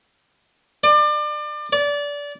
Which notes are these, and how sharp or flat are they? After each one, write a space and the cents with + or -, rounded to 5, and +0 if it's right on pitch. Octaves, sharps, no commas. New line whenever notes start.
D5 +30
D5 -25